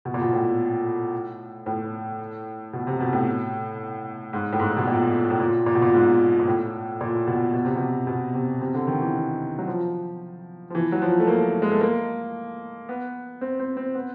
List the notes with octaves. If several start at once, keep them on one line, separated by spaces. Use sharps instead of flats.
B2
A#2
B2
A2
A2
B2
C3
B2
A2
G#2
A2
G#2
B2
A#2
A2
A#2
A#2
B2
A#2
G#2
A#2
A2
A#2
B2
B2
C3
B2
B2
C3
C3
D3
D#3
E3
F#3
F3
F3
E3
F#3
F3
A3
A#3
G#3
A3
A#3
B3
C4
C4
C4
B3